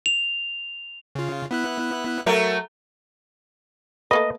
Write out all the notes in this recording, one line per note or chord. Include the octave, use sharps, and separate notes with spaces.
F7
C#3 F4
B3 E4 F#6
F#3 A3 A#4
A3 A#3 B4 D#5